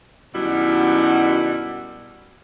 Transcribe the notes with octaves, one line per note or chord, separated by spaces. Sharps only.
F#2 B2 D#3 G3 E4 F#4